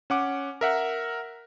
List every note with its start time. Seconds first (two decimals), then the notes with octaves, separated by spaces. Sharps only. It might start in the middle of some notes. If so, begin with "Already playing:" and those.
0.10 C#4 F#5 D6
0.61 A#4 E5 F#5